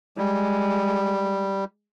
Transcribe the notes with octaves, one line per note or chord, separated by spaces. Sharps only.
G3 G#3